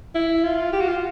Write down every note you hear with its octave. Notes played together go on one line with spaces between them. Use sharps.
E4
F4
G4
F#4
F4